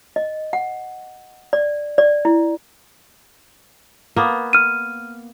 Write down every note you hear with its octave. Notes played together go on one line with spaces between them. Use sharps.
D#5
F#5
D5
D5
E4
A#3 B3
F6 D#7